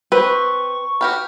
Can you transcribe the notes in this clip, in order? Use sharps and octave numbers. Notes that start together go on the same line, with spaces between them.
C4 B4 C#6
F#4 G4 B4 F6